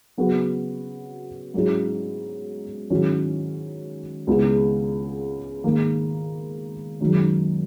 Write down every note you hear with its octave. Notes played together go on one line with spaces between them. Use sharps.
C#3 F#3 B3 F#4
G#2 F#3 C#4 E4
G#2 D#3 F#3 C#4 E4
C#2 C#3 G#3 B3 E4
G#2 D#3 A#3
F#2 D#3 G#3